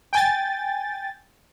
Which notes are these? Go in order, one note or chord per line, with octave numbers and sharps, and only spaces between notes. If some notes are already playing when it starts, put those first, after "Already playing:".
G5 G#5 A6